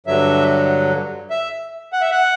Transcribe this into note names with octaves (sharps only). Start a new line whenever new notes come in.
G2 D3 F#3 E5
E5
F#5
E5
F#5